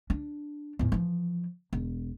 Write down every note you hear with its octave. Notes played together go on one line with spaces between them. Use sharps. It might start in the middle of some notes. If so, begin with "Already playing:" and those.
D4
E2 A2
E3 F3
E1